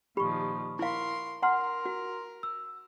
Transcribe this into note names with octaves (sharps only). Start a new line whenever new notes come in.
A#2 D#3 F3 G4 B5 C#6
E4 A#4 F5 C6
A#4 F#5 A#5 C6 F6
F#4
E6